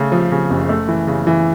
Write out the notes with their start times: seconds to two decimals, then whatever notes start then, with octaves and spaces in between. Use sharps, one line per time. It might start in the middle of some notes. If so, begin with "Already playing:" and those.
Already playing: C#3 A3
0.12 F3
0.31 C#3
0.50 F#1
0.69 A3
0.88 E3
1.07 C#3
1.27 E3